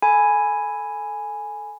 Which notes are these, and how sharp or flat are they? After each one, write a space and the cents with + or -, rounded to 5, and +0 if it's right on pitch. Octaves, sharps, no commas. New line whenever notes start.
A4 +0 G#5 +0 B5 +0